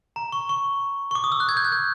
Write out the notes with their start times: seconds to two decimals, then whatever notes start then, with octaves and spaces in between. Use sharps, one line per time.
0.16 A#5
0.32 C#6
0.49 C#6
1.11 C#6
1.15 D6
1.24 D#6
1.32 E6
1.40 F#6
1.49 G#6
1.57 G6
1.65 F#6
1.72 G6